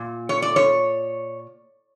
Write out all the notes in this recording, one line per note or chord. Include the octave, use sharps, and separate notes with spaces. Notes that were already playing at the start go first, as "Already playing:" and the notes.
Already playing: A#2
C#5
D5
C#5